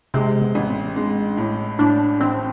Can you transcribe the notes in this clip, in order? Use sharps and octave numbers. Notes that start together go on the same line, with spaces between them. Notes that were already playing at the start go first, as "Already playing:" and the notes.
C3 G#3
B3
A1
C4
G#3 D4
A2 E4
A2 D4
A1 C4